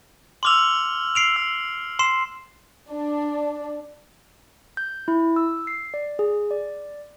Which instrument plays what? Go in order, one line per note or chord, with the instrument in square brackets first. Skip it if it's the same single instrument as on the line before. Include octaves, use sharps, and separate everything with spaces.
[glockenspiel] C6 D6 F7 [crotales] E6 F6 F#7
[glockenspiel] C7 D7 F7
[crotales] E6
[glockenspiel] C6 C7 E7
[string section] D4
[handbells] G6
E4
E6
C7
D5
G#4
D5